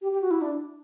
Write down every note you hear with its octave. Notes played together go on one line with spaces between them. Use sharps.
G4
G4
F#4
E4
D4